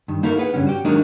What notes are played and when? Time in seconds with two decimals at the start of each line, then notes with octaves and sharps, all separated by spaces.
0.08 G2 D#3
0.23 A#3 D#4 E4 F#4 A4 A#4
0.37 G#4 B4 F#5
0.54 G2 D3 G3 C#4
0.67 F#4 G4
0.85 D#3 F#3 G#3 A#3 D4 D#4